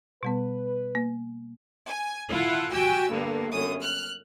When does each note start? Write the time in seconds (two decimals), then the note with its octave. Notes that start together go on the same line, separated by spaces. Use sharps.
0.23 B2 G3 B3 B4
0.95 A#3
1.86 G#5
2.29 E4 F4 A4 F#5
2.71 F#4 G4 G5 G#5 E6
3.10 G2 D3 A#3 B3
3.51 G1 F#2 D#6
3.82 F6 F#6